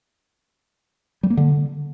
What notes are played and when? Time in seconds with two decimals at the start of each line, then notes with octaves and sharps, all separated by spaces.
1.23 G3
1.30 A#3
1.37 D3